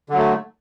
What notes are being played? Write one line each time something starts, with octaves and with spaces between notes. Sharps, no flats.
D3 F#3 A3